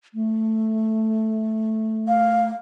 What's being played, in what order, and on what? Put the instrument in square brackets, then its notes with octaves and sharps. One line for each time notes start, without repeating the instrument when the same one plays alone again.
[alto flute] A3
[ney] F5